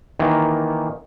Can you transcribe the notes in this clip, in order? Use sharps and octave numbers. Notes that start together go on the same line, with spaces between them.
D#3 E3 A#3